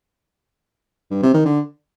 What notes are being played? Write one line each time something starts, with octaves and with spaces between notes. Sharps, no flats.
G2
C3
D#3
D3